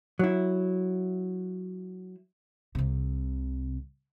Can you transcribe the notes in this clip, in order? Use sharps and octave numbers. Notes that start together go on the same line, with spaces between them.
F#3 E4
C2 C3